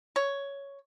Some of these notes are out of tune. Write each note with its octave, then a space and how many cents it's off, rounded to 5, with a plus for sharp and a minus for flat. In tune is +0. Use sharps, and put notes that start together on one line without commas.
C#5 +5